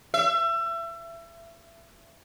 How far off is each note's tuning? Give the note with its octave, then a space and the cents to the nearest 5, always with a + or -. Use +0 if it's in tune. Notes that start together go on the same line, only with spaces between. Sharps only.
E5 +30